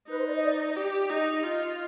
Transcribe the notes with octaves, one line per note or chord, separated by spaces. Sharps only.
D#4 B4
C5
D5
D#5
D5
G4
D#4 D#5
F4